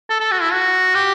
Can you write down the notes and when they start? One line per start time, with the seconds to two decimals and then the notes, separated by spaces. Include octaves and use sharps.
0.10 A4
0.20 A4
0.31 F#4
0.41 E4
0.53 F#4
0.95 G4